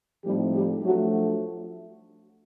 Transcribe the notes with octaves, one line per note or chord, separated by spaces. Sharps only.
A2 F3 G3 A3 C4 D#4 G4
G3 G4
F3 F#3 A3 D4 F#4